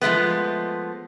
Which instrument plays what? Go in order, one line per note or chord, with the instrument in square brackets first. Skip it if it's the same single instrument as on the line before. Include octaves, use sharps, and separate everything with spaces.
[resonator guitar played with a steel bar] F3 G#3 A3 B3